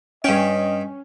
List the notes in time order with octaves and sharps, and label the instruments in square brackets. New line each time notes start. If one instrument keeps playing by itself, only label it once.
[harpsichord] G2 G5 [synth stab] C#4 [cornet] D#5